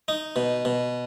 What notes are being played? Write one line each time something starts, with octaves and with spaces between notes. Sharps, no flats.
D#4
B2
B2